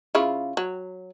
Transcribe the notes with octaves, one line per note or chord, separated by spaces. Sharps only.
C#3 E4 F4
F#3